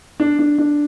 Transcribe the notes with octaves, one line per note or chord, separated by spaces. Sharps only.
D4
D4
D4